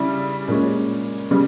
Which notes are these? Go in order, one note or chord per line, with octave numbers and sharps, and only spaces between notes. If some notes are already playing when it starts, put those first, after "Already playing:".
Already playing: C#3 G3 E4
A#2 G#3 C#4
C#3 G3